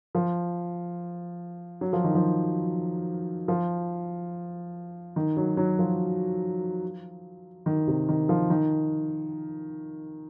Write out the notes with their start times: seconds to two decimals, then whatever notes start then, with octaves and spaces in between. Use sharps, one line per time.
0.15 F3
1.81 F#3
1.93 F3
2.04 D#3
2.15 F3
3.48 F3
5.16 D#3
5.37 F#3
5.57 F#3
5.79 F3
7.66 D#3
7.87 C3
8.09 D#3
8.29 F3
8.50 D#3